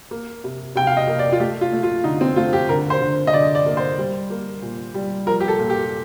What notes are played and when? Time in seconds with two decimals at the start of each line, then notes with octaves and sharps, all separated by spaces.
0.11 A#3
0.44 C3
0.75 C3 G5
0.87 F5
0.97 D#5
1.08 A#3
1.19 D5
1.32 F4
1.40 A3 G4
1.61 F4
1.73 A3
1.83 F4
2.04 D3 D#4
2.21 C4
2.36 A3 F4
2.53 G4
2.69 D3 A#4
2.90 C5
3.01 D3
3.27 D#5
3.33 D3 D5
3.55 D5
3.66 A#3
3.77 C5
3.98 G3
4.30 A#3
4.62 A#2
4.94 G3
5.26 F3 A#4
5.40 G4
5.48 A4
5.59 A#2
5.70 G4